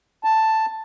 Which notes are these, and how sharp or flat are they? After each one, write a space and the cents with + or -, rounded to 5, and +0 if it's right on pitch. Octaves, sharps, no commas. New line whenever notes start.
A5 +5